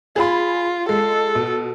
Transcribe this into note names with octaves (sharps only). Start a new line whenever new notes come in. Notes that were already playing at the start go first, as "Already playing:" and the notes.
F4 G#4 B5
G#3 A4
B2